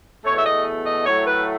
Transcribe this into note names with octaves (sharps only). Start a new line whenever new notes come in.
E2 B2 A3 C#5
E5
D#5
D#5
A2 F#3 A3 C#5
B4